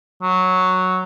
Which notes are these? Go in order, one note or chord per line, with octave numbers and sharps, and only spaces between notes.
F#3